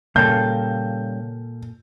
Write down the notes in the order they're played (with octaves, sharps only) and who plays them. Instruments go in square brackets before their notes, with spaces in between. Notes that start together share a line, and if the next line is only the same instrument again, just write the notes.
[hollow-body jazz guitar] A#2 A#3 A4 [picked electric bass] C#3 G3 [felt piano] G6